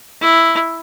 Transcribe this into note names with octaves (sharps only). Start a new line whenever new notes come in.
E4